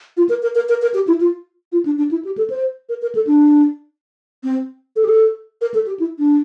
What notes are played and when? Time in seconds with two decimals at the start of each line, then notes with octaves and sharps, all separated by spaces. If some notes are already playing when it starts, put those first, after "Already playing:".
0.17 F4
0.29 A#4
0.42 A#4
0.55 A#4
0.69 A#4
0.82 A#4
0.94 G4
1.08 E4
1.21 F4
1.72 F4
1.86 D4
1.98 D4
2.11 E4
2.25 G4
2.38 A4
2.50 C5
2.89 A#4
3.02 A#4
3.15 A4
3.27 D4
4.44 C4
4.96 A4
5.04 G4
5.08 A4
5.61 A#4
5.74 A4
5.87 G4
6.00 E4
6.19 D4